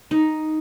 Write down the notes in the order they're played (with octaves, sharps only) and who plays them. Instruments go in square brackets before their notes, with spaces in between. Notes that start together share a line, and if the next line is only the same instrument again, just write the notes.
[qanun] D#4